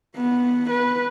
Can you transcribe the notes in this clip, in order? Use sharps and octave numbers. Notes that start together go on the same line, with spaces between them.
B3
B4